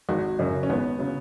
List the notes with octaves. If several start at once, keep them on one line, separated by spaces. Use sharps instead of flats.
G#1 F#4
F#2 C#3 F#3
C#4
G#1 B3
C#3 F#3